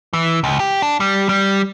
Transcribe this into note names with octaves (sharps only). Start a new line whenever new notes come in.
E3
C#2
G4
D4
G3
G3